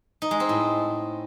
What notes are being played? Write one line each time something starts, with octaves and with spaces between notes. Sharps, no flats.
D#4
G#3
C4
A2